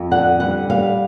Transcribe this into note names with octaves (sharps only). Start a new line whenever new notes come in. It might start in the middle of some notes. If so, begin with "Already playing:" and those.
Already playing: F2
D3 F#5
G3 F#5
G3 F5